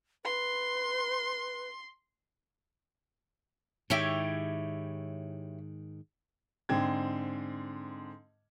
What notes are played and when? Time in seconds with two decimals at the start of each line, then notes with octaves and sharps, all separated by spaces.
0.24 B4 C6
3.90 G#2 D#3 E4 G4 C#5
6.69 G#2 D3 C4 G#6